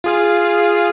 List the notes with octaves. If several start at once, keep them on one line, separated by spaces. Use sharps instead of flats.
F4 G#4 F5